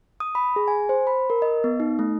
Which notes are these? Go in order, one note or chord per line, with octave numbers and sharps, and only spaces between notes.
D#6
B5
G#4
G#5
C5
B5
A#4
D#5
B3
D#4
A3